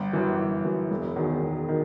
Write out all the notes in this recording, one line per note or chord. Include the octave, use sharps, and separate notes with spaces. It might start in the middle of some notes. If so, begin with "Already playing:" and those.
Already playing: G1
F#2 E3
G1
F#2 E3
E1
E2 D#3 F#3
E1
D#3 F#3